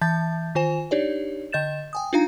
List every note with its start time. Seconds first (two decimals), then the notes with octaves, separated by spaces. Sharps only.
0.01 E3 E5 A5 G6 A6
0.55 D#3 F4 C5 G#5 E7
0.91 D4 D#4 G4 C#5 D5
1.52 D3 D#5 G6 A6 E7
1.93 G5 G#5 D#6
2.13 D4 D#4 F4 F5 A#5